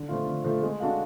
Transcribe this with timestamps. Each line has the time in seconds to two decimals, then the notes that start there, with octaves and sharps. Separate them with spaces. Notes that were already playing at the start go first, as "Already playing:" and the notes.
Already playing: D3
0.08 F3 A3 F4
0.26 D3
0.44 F3 A3 F4
0.63 G#3
0.80 D4 F#4 A4 F5